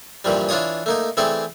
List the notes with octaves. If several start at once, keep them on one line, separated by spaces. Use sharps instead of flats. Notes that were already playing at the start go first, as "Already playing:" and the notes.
G2 A#2 E3 F3 G3
E3 D4 F4 C#5 D#6
A3 A#3 D#4
E3 A3 C4 G#4 D5